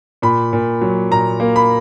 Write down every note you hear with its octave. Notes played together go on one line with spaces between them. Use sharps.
A#2 B5
A#2
F#3
A#2 A#5
A#3
B5